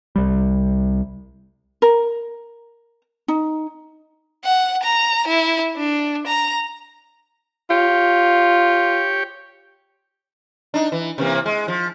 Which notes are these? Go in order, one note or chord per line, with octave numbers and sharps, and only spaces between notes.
C2 G3
A#4
D#4
F#5
A#5
E4
D4
A#5
F4 G4 C#5 G5
D4 D#4
E3
C3 E3 A#3
G#3
F3